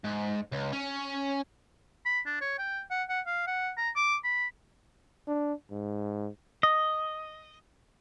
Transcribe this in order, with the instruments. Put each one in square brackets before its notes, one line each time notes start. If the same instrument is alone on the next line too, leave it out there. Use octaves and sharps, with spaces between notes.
[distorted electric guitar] G#2
C#2
C#4
[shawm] B5
D4
C#5
G5
F#5
F#5
F5
F#5
A#5
D6
B5
[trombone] D4
G#2
[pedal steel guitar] D#5